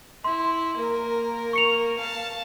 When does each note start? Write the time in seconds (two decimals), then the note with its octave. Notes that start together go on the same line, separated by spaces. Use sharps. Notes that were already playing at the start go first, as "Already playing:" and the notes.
0.24 E4 C6
0.77 A#3 A#4
1.53 C#6 C#7 F7
1.99 F5 A5